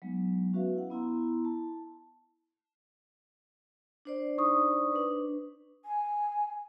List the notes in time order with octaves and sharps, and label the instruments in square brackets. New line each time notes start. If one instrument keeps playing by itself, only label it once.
[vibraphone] F#3 G#3 B3 D#4
B3 C#4 F#4 B4 E5 F5
E4 F#5
B3 E4 A#5 C6
A5
D4 C5 D5
[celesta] D#4 C#6 D#6
[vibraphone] D4 B4
[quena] G#5